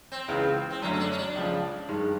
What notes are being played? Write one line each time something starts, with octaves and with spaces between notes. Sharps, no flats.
C4
C#2 C#3 E3
C4
F#2 D3 F#3 A3 C#4
C#4
D4
C#4
D4
C#2 C#3 F3
G2 D#3 G#3